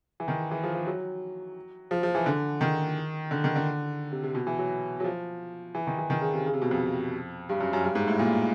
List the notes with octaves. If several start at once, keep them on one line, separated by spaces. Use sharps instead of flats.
E3
D#3
E3
F3
F3
F#3
F3
F3
E3
D3
D#3
D3
D#3
D3
C3
C3
B2
E3
F#3
F#3
F3
E3
D#3
E3
D#3
C#3
C3
C#3
C3
B2
F2
G2
F#2
F#2
G2
G#2
A2
A#2